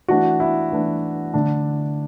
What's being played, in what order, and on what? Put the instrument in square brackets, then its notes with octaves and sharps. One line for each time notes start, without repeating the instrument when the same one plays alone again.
[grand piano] E3 A3 D4 F#4
E4
E3 A3 D4
D3 A3 D4